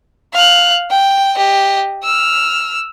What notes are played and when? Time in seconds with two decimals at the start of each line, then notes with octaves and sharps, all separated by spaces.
0.34 F5 F#6
0.90 G5
1.35 G4 D#5
2.03 E6 F6